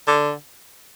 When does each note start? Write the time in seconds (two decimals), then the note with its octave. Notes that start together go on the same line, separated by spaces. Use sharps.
0.08 D3